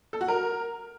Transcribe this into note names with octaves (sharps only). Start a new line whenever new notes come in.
A4
F#4
A#4